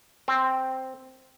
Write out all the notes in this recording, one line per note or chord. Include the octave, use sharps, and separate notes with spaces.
C4